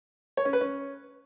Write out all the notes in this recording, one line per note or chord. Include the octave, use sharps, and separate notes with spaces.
C#5
C#4
B4
C#4